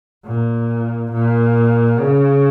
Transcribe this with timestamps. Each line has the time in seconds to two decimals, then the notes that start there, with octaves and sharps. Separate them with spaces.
0.25 A#2
1.12 A#2
1.98 C#3